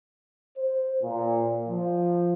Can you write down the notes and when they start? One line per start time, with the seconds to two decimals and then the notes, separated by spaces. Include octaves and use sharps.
0.57 C5
1.02 A#2
1.67 F3